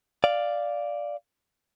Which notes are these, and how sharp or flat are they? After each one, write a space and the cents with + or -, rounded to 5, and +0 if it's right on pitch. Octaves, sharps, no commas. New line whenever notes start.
D5 +0 F5 +0